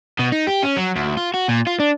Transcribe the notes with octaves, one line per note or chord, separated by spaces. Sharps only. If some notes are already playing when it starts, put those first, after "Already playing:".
B2
D#4
G4
C#4
F#3
D2
F4
F#4
A#2
F4
D4